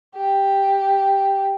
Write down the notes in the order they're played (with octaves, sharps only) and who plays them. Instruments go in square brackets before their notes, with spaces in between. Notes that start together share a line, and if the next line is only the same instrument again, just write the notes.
[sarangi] G4